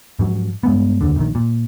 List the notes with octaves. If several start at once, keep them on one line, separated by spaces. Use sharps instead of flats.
G#2 F3 F#3 C#4
G2 G#3 B3
F1 A#1 D#2 D3
A#1 D#3
A#2